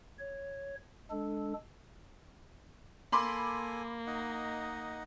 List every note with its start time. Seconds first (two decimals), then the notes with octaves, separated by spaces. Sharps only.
0.19 C#5
1.10 G#3 D4 A4
3.12 A#3 A4 G#5 B5 C6 D6
4.07 D#4 D#5 F#5